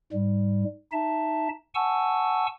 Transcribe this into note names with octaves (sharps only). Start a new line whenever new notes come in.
G#2 G3
D#4 E5 A5
F#5 G#5 A5 C#6 E6